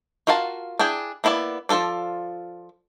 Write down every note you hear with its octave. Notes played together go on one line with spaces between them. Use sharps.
F4 F#4 A#4 F5 A5
D4 E4 G#4 G5 G#5
A#3 B3 E4 A4 D5
F3 A#3 F4 A4 D5